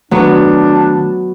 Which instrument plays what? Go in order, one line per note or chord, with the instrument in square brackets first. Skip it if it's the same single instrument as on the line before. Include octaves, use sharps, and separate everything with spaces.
[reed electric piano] D#3 A3 [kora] F#3 B3 [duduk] D4 [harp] F#4